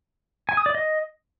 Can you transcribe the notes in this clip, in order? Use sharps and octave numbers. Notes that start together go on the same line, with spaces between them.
G#5
D#6
D5
D#5